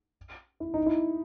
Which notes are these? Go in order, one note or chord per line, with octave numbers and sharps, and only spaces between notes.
E4
D#4
E4